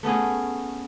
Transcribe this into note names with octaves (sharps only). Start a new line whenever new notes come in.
A3 B3 C#4 G#4